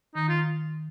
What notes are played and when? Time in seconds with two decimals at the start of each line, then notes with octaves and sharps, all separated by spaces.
0.15 D#3 D#4
0.29 F4